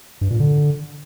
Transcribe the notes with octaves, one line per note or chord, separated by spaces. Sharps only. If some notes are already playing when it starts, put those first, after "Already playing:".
G2
A#2
D3